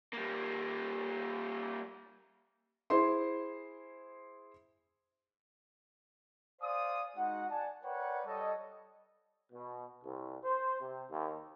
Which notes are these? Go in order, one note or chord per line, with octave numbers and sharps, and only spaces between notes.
G3 A#3
E4 G#4 C5 C6
C5 D5 F5 G#5 D#6
G#3 D#4 F#4 F#5
D5 F#5 G#5 A5
A#4 B4 C#5 D5 F#5 G5
G3 A4 C#5 D#5
B2
C2
C5
C3
D#2